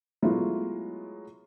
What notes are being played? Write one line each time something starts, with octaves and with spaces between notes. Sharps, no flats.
F#3 G#3 A3 B3 E4 F4